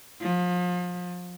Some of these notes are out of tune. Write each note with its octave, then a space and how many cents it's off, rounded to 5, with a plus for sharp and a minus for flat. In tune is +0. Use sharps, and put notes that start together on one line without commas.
F3 +35